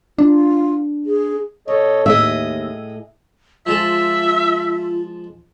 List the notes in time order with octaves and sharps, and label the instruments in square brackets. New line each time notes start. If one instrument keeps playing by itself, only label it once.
[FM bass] D4 [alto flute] F4
[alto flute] G#4
[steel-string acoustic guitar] C3 [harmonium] A4 C#5 D#5
[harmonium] D#2 [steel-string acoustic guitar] A2 G#4 D#5 [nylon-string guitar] E5
[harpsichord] F3 G#3 A5 [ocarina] F4 [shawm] E5